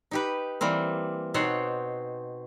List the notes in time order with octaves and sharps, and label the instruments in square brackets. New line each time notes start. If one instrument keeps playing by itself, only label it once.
[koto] D#4 G4 B4
E3 G3 A#3 C4
B2 C4 D#4 C5 C#5 F#5